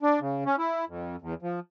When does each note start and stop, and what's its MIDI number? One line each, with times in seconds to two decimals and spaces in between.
0.03 0.20 62
0.21 0.44 49
0.46 0.56 61
0.58 0.85 64
0.88 1.16 41
1.22 1.34 40
1.42 1.60 53